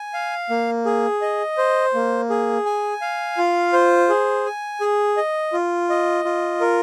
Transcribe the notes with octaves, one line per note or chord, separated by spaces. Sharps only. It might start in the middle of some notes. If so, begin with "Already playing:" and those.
Already playing: G#5
F5
A#3
G#4
D#5
C5
A#3
G#4
G#5
F5
F4
C5
G#4
G#5
G#4
D#5
F4
D#5
F4
A#4